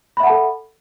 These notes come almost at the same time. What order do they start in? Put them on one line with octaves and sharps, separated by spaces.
B5 E5 F#5 A5 A4